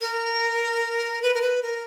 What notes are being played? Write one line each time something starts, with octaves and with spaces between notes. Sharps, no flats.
A#4
B4
A#4
B4
A#4